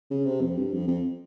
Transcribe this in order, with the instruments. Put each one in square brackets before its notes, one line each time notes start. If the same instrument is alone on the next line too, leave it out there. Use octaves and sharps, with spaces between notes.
[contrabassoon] C#3
C3
F2
G2
F2
F2